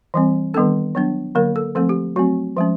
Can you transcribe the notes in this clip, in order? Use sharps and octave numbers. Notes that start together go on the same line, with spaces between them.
E3 G3 C4
D#3 G3 B3 D4 A4
F#3 B3 D4
D3 F#3 A#3 A#4
A4
F3 A3 C4 A4
G4
F#3 A3 C4 F#4
F3 G#3 C#4